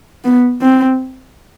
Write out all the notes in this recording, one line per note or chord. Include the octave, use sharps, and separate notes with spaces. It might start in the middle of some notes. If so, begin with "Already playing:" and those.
B3
C4